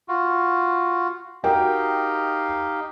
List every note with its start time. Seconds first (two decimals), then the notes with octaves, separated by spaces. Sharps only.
0.09 F4 F#4
1.44 D#4 F#4 G4 A#4 F5 G5